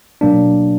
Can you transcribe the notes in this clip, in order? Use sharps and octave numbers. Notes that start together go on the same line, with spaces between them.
B2 F#3 A#3 D4